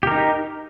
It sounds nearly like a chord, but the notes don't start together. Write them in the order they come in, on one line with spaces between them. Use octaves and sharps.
G4 A#4 D#4